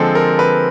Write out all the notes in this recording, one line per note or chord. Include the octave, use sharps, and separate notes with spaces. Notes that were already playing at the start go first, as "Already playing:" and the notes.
Already playing: D3 F3 G#3 C4 A4
A#4
B4